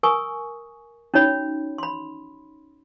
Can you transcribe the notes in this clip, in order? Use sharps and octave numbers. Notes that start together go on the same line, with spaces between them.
A#4 G#5 C#6 D#6
C#4 D#4 F#4 C#5 B5
B5 C6